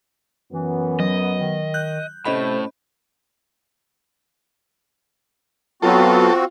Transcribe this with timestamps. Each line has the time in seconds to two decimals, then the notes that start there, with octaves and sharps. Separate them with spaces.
0.53 F#2 E3 B3
1.00 F#3 D#5
1.39 D#3
1.74 F#6 G6
2.25 A2 C3 A3 C#4 C5 D#5 B5
5.82 F#3 B3 C4 F4 F#4 A4